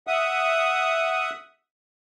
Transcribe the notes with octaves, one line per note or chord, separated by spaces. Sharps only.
E5 F#5 D#6